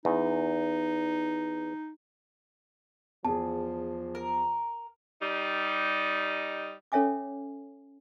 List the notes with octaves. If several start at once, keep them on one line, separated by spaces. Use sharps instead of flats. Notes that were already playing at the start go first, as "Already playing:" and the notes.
E2 D#4
E2 F3 G#4 A5
A#4
G3 D#4
C#4 A4 C#5 E5 G#5 D6